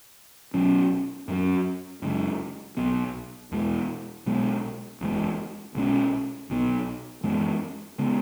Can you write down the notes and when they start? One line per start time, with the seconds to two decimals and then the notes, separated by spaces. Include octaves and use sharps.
0.54 B1 B2 F#3 C#4
1.28 F#2 F#3 C#4
2.02 F#2 C#3 G#3
2.77 B1 B2 B3
3.52 E2 B2 G#3
4.26 B1 B2 G#3 B3
5.01 F#1 E2 B2 G#3
5.75 B1 B2 G#3 C#4
6.49 B1 B2 B3
7.23 F#2 E3 G#3 B3
7.99 C#3 G#3 B3